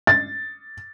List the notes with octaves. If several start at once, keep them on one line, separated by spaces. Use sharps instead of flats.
A6